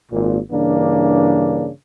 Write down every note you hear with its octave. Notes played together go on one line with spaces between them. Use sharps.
G#1 A#2
G2 C#3 E3 A#3 D4